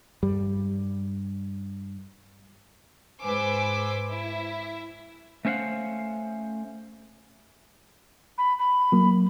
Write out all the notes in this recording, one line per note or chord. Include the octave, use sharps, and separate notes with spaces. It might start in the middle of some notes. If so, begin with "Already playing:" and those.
G2 G3
G#2 B4 C5 G#5 D6 E6
E4
A3 C#4 C5 F5 F#5
B5
B5
F#3 A#3